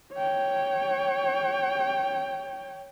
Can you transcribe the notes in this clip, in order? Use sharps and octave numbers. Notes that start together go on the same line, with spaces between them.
C#5 G5